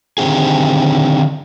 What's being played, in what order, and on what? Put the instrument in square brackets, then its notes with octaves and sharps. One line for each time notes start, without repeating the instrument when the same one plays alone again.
[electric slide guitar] D3 D#3 G#3 C4 G4 G#4